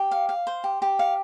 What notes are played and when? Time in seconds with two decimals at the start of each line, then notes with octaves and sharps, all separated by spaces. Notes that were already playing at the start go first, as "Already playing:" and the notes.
Already playing: G4
0.11 F5
0.29 F5
0.47 C5
0.64 G4
0.82 G4
0.99 F5